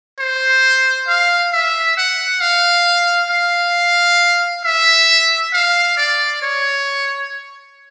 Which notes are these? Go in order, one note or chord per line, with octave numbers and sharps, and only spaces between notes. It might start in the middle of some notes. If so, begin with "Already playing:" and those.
C5
F5
E5
F#5
F5
F5
E5
F5
D5
C#5